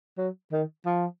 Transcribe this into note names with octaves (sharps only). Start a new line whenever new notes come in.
F#3
D#3
F3